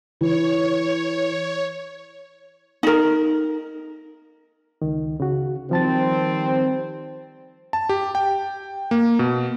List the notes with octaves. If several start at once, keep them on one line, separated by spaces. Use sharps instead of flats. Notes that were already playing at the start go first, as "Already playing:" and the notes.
E3 C#5
D#4 A#4
C#2 D#3
C#3 F#4
D#3 F3 G3 C4 A5 A6
A5
G4
G5
A#3
B2